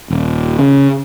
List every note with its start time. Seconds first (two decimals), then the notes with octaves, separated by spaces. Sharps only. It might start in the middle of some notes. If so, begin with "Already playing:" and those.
0.10 D#1
0.59 C#3